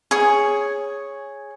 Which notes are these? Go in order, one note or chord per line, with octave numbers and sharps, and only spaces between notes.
G#4 C#5